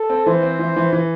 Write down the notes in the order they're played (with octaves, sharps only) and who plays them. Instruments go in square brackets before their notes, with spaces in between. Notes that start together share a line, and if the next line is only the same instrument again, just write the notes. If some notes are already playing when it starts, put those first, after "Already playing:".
Already playing: [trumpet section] A4
[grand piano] C4
[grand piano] E3 [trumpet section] C5
[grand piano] C4
E3
E3
E3